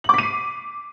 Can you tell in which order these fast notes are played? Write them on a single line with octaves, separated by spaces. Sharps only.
F#7 D6 B6 D#7 C7